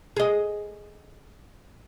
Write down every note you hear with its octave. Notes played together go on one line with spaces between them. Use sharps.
G#4 D#5